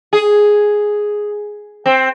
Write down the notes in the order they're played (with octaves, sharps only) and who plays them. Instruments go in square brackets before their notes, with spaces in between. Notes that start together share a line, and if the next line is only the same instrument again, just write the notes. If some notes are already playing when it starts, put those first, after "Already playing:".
[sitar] G#4
C4